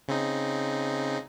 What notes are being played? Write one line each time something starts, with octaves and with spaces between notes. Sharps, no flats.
C#3 C4 D#4